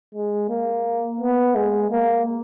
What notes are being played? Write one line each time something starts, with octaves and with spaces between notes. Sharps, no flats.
G#3
A#3
B3
G#3
A#3